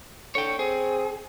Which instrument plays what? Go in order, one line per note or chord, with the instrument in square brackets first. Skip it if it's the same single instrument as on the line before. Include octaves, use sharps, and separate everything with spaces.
[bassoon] D3 [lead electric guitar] C#5 G5
[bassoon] C4 [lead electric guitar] G#4